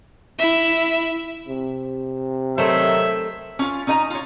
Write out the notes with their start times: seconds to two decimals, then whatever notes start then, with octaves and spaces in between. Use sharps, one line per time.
0.39 E4 E5
1.48 C3
2.58 D#3 F#3 A3 C5 E5
3.59 C#4 F4
3.87 C#4 D#4 D#5 F#5 A#5
4.10 F4 C#5